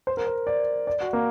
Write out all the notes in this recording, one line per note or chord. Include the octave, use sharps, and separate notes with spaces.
C5
A#4
C5
D5
D5
F#4
A#3